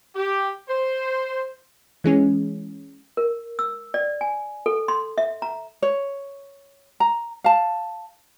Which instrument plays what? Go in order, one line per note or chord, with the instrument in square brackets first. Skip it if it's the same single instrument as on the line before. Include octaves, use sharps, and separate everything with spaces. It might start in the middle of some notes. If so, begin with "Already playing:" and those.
[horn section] G4
C5
[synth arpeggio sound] E3 G#3 C#4
[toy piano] A#4
E6
D5
G#5
A4
C6
E5
A#5
[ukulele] C#5
A#5
F5 A5